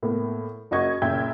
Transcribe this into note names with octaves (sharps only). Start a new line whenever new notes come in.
A2 A#3 B3
F#1 F#4 A#4 D#5 C#6 G#6
F#1 A#2 E5 G5 G#6